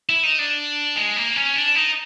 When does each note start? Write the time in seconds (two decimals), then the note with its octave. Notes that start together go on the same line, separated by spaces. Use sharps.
0.09 E4
0.23 D#4
0.39 D4
0.96 G#3
1.17 A#3
1.36 C#4
1.56 D4
1.75 D#4